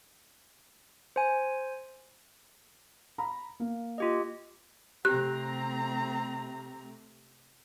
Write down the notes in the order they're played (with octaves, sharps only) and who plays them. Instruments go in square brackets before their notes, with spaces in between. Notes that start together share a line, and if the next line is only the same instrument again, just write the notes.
[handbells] C5 G#5
[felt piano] A#5 B5
A#3
[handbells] F4 G4 D#5
[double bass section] C3 A3 [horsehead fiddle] C4 A#5 [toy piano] G4 [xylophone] F#6